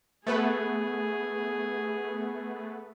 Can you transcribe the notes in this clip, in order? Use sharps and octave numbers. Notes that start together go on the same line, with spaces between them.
A3 B3 G#4 B4